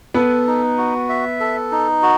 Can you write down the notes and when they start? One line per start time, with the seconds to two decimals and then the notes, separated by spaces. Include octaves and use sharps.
0.14 B3 A4 B4
0.47 D#4
0.78 F#4
1.09 E5
1.40 A4
1.71 D#4
2.02 F#4